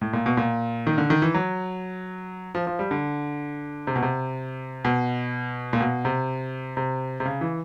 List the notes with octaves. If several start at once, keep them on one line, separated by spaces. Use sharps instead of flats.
A2
A#2
B2
A#2
D#3
D3
D#3
E3
F#3
F3
F3
G3
D3
C3
B2
C3
B2
A#2
B2
C3
C3
C3
C#3
E3